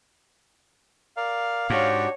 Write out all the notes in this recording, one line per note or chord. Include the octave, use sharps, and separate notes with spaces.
A#4 D5 F5
G#2 D4 F#4 G4 C#5